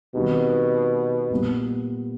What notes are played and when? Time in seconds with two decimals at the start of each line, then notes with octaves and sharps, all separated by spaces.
0.14 B2 D#3 G3 C4 D#4 G4
1.31 A#2 G3 B3